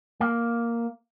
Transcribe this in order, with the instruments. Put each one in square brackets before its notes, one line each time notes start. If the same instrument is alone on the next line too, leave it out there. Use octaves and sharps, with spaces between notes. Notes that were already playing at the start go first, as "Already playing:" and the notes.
[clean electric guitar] A#3